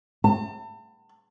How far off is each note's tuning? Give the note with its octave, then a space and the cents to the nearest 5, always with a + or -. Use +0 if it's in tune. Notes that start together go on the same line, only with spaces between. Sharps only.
A5 +40